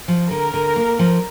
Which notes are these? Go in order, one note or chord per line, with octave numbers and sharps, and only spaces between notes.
F3
D3 A#4
D3
A#3
F3